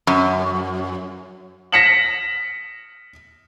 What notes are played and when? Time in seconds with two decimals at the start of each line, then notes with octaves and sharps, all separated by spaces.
0.07 F#2
1.72 A#6 B6 C#7 E7 F#7